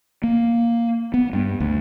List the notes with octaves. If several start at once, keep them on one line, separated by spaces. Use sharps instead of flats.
A#3
B3
G2
D2